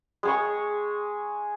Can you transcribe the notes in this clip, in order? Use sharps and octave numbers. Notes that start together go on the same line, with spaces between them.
G#3 G#4 C#6